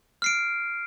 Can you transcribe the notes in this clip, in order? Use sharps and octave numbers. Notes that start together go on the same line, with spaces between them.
F6 C7 D7